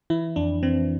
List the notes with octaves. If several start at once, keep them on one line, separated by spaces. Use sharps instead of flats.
E3 E4
F2 D4
E3 C4